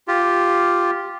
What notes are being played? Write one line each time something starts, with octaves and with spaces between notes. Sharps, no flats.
F4 G4